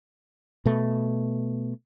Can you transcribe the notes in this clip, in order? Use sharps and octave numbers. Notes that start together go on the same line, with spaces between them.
B2 A3